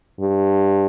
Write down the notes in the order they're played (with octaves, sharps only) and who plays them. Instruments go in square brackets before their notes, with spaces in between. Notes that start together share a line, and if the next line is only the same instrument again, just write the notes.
[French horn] G2